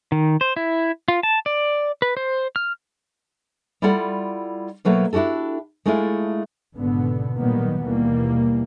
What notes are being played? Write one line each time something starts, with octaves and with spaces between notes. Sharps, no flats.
D#3
C5
E4
F4
A5
D5
B4
C5
F6
G3 E4 F4 A4 D5 F#5
B2 F#3 A3 A#3
D4 E4 F#4 G4 A4
G#3 A3 D4 E4 F4
G#1 B2 D3 B3
A#2 D#3 F#3 G3 A#3 B3
D#2 B2 E3 G3 A#3